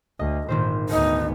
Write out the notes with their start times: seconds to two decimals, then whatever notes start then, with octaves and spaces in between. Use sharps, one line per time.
0.19 D2 D#5
0.49 G#1 A#2 D#3 C5
0.89 D2 B3 D#4